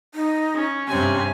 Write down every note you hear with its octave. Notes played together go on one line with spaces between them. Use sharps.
D#4
C#4
G2 C3 C#4 G#5